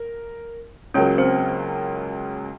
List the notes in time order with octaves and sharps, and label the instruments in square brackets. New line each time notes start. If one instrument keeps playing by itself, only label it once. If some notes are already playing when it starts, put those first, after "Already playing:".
Already playing: [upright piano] A#4
[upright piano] C#2 C#3 F#3 A#3 [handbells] C#4 C#5
[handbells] C4 C5